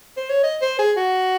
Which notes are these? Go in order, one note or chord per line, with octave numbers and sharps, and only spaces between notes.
C5
C#5
D#5
C5
G#4
F#4